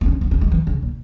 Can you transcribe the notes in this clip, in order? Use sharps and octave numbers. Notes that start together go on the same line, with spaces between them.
B3
C#4
B3
C#4
G#3
E3
C#3
A#2